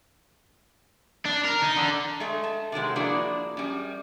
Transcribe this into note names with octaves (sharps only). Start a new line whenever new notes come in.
D4
A#4
D#4
D3
G#3 A3
A5
C3 D#3 F#3 G#3
F3 A#3 D4 E4 F#4 G#4
F#2 G3